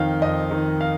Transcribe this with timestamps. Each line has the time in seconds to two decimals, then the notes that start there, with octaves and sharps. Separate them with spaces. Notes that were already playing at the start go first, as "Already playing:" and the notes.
Already playing: F2 D#3 F5 G5
0.22 F2 D#5
0.51 D#3
0.81 F5